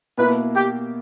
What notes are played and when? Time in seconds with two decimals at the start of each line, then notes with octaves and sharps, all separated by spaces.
0.18 B2 A#3 E4 B4
0.56 G4